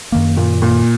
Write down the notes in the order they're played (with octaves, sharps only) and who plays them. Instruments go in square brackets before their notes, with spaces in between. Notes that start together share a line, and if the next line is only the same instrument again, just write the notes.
[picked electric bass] F#2 D#3 A#3
[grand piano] A#2
A#2